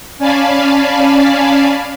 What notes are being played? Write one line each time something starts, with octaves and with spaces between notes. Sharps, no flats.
C#4 D5 F5 G#5 A5 B5